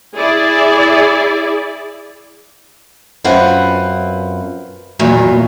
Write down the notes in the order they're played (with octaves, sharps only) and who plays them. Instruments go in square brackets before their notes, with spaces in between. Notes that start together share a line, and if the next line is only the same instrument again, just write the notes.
[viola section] E4 G#4 D5
[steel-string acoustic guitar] F#2 C4 F4 B4 F#5 G#5
E2 G2 A#2 D#3 F#3